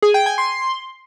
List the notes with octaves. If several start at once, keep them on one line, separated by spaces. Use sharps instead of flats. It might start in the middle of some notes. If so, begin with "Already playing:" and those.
G#4
G5
G#5
C6